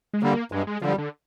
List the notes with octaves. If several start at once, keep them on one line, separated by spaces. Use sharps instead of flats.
G#3
D3 G3 A#3
G2 G#3
G#3
D3 F3 G3
D3